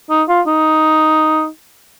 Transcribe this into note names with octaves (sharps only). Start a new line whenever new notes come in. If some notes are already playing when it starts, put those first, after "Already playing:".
D#4
F4
D#4